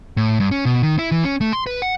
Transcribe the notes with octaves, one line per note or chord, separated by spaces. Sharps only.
A2
G2
C#4
B2
D#3
E4
E3
C#4
A3
C6
B4
F#5